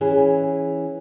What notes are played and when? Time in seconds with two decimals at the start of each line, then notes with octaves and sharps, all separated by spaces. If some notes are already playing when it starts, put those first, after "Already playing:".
0.01 E3 C#4 G#4